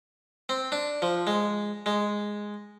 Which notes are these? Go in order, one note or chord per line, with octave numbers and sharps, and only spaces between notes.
C4
D4
F3
G#3
G#3